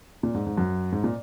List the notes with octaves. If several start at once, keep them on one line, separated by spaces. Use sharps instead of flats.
A#2
G#2
G#2
F#2
G#2
A#2